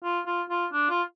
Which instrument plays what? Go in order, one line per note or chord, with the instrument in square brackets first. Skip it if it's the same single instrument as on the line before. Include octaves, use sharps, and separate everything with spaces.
[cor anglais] F4
F4
F4
D4
F4